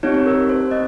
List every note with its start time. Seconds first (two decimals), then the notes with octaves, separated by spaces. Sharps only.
0.03 C4 D#4 G4 C#5
0.26 A#4
0.49 C5
0.71 C4 D#5